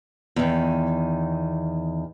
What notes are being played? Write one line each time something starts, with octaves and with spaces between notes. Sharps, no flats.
E2 D#3